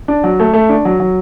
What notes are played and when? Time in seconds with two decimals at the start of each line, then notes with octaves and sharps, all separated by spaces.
0.08 D4
0.24 F#3
0.39 A3
0.54 A3
0.69 D4
0.85 F#3
1.00 F#3